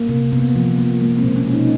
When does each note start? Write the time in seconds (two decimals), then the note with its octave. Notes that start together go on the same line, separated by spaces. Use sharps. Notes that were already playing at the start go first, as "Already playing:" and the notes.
Already playing: A#3
0.09 C3
0.32 C3 B3
0.55 F3
0.78 A#3
1.01 G#3 A#3
1.18 C4
1.24 B2
1.36 C#4
1.47 G#3
1.54 D#4